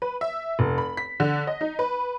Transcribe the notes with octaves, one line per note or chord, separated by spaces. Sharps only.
B4
E5
F1
B5
B6
D3
D#5
D#4
B4